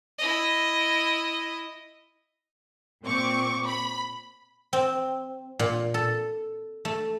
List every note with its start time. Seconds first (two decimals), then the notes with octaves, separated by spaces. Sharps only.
0.18 E4 D#5
3.04 A#2 C4 C#6 D6
3.66 B5
4.73 C4
5.59 A#2
5.94 A4
6.85 A3